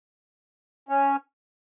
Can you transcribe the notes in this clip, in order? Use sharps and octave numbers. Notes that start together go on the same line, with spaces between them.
C#4